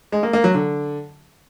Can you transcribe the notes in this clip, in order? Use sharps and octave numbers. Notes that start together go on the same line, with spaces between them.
G#3
A#3
A#3
F#3
D3